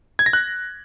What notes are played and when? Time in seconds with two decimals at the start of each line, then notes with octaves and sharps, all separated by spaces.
0.19 G#6
0.26 A#6
0.33 F#6